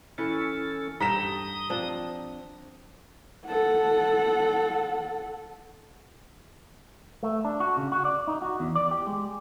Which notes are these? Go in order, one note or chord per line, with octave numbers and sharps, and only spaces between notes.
E3 C#4 A4 B4
G2 A4 G5 A#5 D#6 B6 E7
F3 C4 D4
A4 F#5
A3
D4
F#4
C#3
F#4
D5
D#4
F#4
E2
D5
G4
G#3